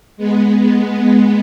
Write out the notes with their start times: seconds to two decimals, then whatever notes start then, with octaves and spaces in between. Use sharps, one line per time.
0.17 G#3 B3